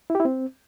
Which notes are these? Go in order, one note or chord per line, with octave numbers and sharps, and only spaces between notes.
E4
G4
E4
C4